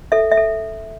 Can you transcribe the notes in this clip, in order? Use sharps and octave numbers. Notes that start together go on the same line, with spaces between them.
A4 E5
E5
A4